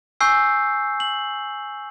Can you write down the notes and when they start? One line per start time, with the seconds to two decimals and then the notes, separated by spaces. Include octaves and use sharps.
0.21 G#5 C#6 E6 G6 C7
1.00 F#7